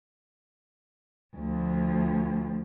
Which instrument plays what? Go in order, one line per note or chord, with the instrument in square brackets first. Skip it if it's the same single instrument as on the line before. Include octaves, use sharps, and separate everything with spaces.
[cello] D2 F3